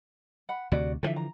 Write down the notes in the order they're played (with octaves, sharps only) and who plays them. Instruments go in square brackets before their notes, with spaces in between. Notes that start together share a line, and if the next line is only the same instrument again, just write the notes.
[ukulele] F#5 B5
[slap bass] D2 C3 [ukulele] F#4 D5
[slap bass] D3 E3 F3 [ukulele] A4 E5
[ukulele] A#5